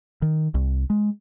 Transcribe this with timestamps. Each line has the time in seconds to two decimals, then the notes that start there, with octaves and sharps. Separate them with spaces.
0.22 D#3
0.54 C2
0.90 G#3